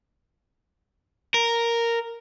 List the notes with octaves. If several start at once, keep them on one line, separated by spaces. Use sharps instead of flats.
A#4